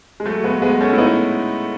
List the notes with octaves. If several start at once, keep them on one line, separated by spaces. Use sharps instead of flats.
G#3
F#3 A3
G#3 B3
G#3 B3
A3 C#4
E4
B3 D#4